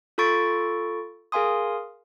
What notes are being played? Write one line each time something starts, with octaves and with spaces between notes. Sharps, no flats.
F4 A4 B5 C#6 A6 D7
G#4 A#4 F5 G#5 C6 D#6